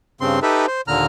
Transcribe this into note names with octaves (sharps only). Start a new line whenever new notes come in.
G2 C#3 C4 C6
D#4 G4 A4 B4 E5
C5
D#2 A#2 D3 A#5 F6